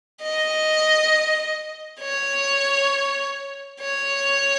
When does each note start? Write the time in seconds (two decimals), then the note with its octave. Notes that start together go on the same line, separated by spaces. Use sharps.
0.22 D#5
2.01 C#5
3.81 C#5